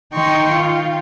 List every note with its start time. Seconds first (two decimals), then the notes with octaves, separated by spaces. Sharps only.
0.13 D#3 D#4 G5 C6 C#6
0.52 F4